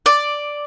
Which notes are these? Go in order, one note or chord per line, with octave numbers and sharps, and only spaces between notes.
D5